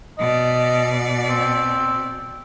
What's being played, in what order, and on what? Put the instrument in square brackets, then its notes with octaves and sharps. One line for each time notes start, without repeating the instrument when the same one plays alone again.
[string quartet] B2 D5 [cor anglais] D#5
[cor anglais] C4